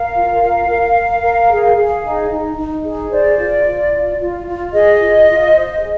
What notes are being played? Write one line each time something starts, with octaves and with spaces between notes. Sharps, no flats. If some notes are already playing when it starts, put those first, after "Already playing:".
Already playing: A#4 F5
F4
A#4
A#4
A#4
A#4
G#4
G#4
D#4
D#4
D#4
G#4
C5 D5
F4
F4
F4
F4
F4
G#4 D#5
F4
F4
C5
G#4